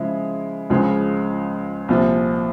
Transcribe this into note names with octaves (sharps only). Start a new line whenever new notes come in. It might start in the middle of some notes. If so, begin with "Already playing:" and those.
Already playing: C#3 F3 G#3 E4
C#2 C#3 F3 G#3
C2 A#2 F3